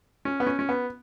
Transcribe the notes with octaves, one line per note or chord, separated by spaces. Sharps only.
C#4
B3
C#4
C#4
B3